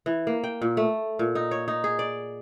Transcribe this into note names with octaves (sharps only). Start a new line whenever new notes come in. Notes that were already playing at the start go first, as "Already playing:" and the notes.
E3
A#3
G5
A#2
A3
A#2
D#4
C#5
D#4
G#4
D5